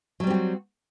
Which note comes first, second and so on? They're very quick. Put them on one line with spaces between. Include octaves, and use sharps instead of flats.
F#3 G3 C4 G4 F#4